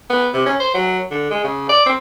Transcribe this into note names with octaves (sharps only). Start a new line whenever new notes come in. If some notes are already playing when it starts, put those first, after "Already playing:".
B3
C3
C#4
C5
F#3
D3
G#3
C#3
D5
C4